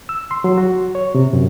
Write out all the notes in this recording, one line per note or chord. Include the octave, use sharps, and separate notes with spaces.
E6
C6
F#3
F#4
C#5
C3
F#2